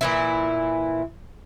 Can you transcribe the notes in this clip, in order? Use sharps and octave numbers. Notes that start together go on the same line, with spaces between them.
A#2 E3 E4